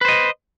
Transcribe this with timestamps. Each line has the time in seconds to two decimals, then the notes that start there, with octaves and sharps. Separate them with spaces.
0.01 B4
0.05 C5
0.08 D#5